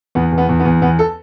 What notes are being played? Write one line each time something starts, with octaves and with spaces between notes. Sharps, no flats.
E2 B3
E2
B3
E2
B3
E2
E2 B3
A4